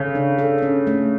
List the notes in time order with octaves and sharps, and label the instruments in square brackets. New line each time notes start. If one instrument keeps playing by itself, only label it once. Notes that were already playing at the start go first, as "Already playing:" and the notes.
Already playing: [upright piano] C#3 [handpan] A4
[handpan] D4
A4
C#4
A3